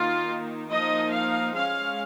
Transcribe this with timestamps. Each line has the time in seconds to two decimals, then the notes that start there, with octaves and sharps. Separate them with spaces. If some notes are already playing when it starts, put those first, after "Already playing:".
Already playing: D#3 A#3 D#4 F4
0.70 F3 A#3 D#4 D#5
1.14 F5
1.56 G#3 C#4 F5